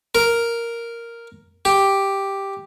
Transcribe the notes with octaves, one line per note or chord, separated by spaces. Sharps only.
A#4
G4